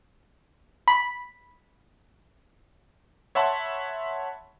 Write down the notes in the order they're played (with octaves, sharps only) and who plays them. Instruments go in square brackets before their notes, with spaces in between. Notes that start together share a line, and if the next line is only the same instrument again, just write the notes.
[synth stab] B5
[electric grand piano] C#5 E5 F#5 A5 B5 C6